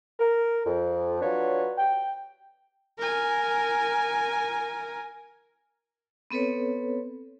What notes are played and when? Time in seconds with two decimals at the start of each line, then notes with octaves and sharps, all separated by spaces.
0.20 A#4
0.66 F2
1.21 F#3 D4 F4 B4 C#5
1.78 G5
2.98 A#4 G#5
6.31 B3 C4 A4 B4 C#5